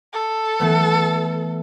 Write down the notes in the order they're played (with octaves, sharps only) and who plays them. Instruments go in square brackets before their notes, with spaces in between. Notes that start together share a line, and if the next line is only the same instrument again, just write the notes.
[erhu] A4
[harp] E3 A3 B3